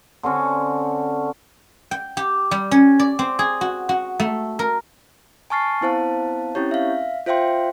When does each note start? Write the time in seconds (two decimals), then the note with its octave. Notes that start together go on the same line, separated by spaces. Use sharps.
0.23 D3 C4 C#4
1.91 G5
2.17 G4
2.51 G3
2.71 C#4
2.99 D5
3.19 C4
3.39 G#4
3.61 F#4
3.89 F#4
4.20 A3
4.59 A#4
5.50 G#5 A5 C#6 F6 A6 C7
5.81 B3 C4 E4 C5 F5 A5
6.55 C4 C#4 E4 G4 C#5
6.71 E5 F5
7.26 F4 C5 E5 F5 G5 C6